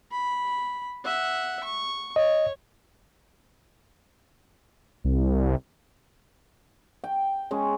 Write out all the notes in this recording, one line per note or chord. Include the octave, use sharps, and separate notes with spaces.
B5
E5 F#5
C#6
C#5 D#5
C2
G5
G#3 C#4